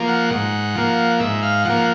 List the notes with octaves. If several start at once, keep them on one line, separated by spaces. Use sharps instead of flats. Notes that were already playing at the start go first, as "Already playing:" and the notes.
Already playing: F3 A#3
F#5
G#2 F#5
F3 A#3
G#2 E5
F5
F3 A#3 F#5